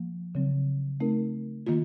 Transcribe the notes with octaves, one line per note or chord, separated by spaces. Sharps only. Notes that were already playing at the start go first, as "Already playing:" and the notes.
Already playing: F3 A#3
C#3 F#3 C4
A3 C4 D#4 A#4
D#3 A#3 F4